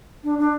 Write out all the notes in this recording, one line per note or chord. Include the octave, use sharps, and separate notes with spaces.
D4
D4